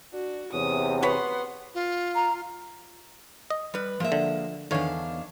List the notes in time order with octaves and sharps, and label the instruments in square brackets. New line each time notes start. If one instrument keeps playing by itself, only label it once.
[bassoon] D4 [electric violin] F#4
[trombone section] E2 C3 [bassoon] C#4 [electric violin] D#6
[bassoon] B3 [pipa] F#4 B4 C#5 [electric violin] F#5 C6
[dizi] F4
[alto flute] A#5
[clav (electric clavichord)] D#5
[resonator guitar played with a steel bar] G3 B4
[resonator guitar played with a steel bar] F3 E5 [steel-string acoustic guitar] G#3 A#3
[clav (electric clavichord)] D3
[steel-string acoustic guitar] E2 G#2 F5 [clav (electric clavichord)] D3 C#5 [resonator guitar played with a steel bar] D#3 D4